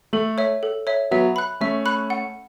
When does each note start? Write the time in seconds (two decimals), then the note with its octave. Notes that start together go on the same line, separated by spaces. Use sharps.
0.13 A3 A4
0.38 C#5 E5
0.63 A4
0.87 C#5 E5
1.11 F#3 B3 E5
1.36 B5 F#6
1.61 A3 C#4 E5
1.86 B5 F#6
2.10 F#5